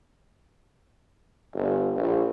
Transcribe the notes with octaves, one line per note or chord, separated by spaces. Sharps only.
G1
A#1